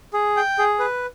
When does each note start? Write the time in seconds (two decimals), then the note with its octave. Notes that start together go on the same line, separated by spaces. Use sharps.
0.13 G#4
0.37 G5
0.59 G#4
0.79 B4